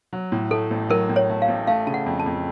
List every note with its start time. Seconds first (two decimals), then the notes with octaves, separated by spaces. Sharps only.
0.13 F#3
0.32 A2
0.51 A3 A4
0.71 A1
0.89 F#3 A#4
1.09 A2
1.16 C#5
1.29 A3
1.42 F5
1.48 A1
1.67 A3 F5
1.87 C#3 A5
1.94 F#5
2.06 F2
2.19 A5
2.26 F2